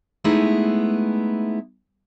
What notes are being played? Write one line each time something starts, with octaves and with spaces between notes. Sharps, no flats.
G#3 A3 B3 D#4 E4 G#4